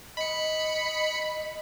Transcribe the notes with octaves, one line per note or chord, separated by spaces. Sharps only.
D#5 B5 C#7